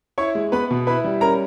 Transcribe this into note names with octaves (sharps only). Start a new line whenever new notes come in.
E4 C#5 C#6
G#3
B3 B4 B5
B2
E4 B4 B5
G3
C#4 A#4 A#5